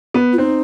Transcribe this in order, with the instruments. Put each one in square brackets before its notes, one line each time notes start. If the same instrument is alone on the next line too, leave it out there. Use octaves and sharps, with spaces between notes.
[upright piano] B3
[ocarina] F4
[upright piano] C4 [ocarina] D#4